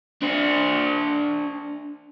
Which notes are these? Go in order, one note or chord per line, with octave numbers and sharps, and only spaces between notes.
D4 C5